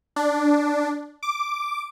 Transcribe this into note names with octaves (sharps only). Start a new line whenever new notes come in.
D4
D6